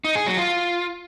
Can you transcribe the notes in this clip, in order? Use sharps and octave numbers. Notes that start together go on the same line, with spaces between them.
D#4
G#4
F#3
F4